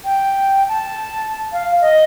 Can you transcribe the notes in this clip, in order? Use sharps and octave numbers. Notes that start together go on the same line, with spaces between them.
G5
A5
F5
D#5